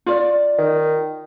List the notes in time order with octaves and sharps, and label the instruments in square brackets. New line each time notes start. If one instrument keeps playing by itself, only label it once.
[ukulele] F4 D5
[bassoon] D#3